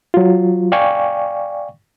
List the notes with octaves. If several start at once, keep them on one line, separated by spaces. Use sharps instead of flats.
F#3 F4
D5 F5 G5 G#5 C#6